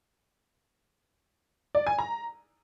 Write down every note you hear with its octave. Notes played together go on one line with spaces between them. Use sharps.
D5
G#5
A#5